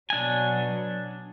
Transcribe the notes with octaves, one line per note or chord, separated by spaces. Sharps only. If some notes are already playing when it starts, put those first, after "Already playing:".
B2 F#3 D4 G#5